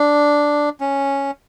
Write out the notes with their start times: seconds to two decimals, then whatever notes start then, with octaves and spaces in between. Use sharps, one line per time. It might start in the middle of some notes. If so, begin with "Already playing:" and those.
Already playing: D4
0.80 C#4